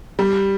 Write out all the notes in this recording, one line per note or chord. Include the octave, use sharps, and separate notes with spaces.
G3